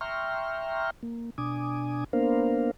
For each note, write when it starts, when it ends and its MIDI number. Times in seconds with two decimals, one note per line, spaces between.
0.01 0.90 76
0.01 0.90 79
0.01 0.90 82
0.01 0.90 84
0.01 0.90 85
0.01 0.90 89
1.03 1.30 58
1.38 2.04 47
1.38 2.04 62
1.38 2.04 80
1.38 2.04 86
1.38 2.04 87
2.13 2.71 58
2.13 2.71 59
2.13 2.71 62
2.13 2.71 70
2.13 2.71 72
2.13 2.71 77